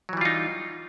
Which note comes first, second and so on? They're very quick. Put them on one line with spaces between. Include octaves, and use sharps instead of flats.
F#3 E3 G3 F4 D#4